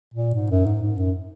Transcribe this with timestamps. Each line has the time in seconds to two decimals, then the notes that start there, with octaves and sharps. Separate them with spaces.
0.14 A#2
0.34 G#2
0.50 F#2
0.66 G#2
0.81 G#2
0.97 F#2